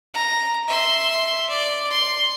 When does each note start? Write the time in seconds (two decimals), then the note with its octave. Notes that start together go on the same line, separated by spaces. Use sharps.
0.14 A#5
0.68 E5 C6
1.49 D5
1.90 C6